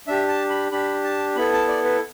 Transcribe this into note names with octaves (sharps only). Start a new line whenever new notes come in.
D4 G4 E5
A5
B5
D4 G4 B5
A5
B3 E4 A4 B5
A5
D5
B4